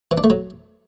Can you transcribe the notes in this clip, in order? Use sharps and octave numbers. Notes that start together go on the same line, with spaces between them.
E3
D4
A3
F#3